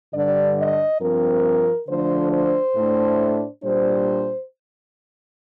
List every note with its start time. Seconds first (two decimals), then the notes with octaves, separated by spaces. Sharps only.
0.14 G2 D3 G3 D4 D5
0.58 D#5
1.01 G2 F3 C4 A#4
1.88 D3 F3 A3 D4 C5
2.32 C5
2.75 A2 A3 D4
3.63 A#2 G3 D4 C5